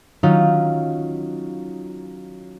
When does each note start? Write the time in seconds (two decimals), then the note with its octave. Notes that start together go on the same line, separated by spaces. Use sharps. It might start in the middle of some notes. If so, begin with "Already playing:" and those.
0.23 D#3 F#3 C#4 D#4 F4